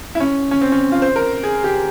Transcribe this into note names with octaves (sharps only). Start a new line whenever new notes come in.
E4
C#4
C#4
C4
C#4
F4
C5
A#4
G#4
G4